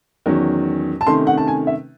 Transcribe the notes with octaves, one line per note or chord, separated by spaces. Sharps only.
E2 D#3 F#3 C#4
A5
C3 D#3 A3 C#4 C6
F#5
A5
G#5
E5